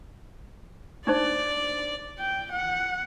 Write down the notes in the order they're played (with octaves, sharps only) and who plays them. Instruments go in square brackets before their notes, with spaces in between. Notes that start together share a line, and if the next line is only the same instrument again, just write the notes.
[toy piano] D4 D#4 C5 [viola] D5
[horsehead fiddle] G5
F#5